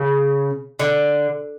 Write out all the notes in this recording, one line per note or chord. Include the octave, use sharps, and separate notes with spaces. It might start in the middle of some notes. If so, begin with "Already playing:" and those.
Already playing: C#3
D3